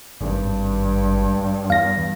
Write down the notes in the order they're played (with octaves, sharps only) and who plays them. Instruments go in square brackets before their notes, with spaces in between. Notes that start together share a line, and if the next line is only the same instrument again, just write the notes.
[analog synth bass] G#1 [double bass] G2
[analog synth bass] E2 [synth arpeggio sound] F5 A#6